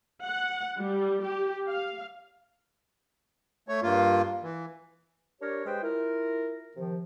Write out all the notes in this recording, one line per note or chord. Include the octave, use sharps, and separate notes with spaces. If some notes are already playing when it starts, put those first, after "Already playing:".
F#5
G3
G4
F5
A3 C#5
G2 A#3 F4
E3
D4 G4 A#4 C#5
G#3 G4 B4 C5 G5
E4 F4 A#4
C3 D#3 F3